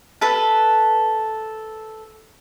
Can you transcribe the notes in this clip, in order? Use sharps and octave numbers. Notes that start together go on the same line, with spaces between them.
A4 B4